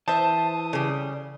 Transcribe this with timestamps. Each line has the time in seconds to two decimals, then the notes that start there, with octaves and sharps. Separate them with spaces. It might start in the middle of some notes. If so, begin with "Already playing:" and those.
0.08 E3 C5 E5 A5 D#6
0.73 C#3 G3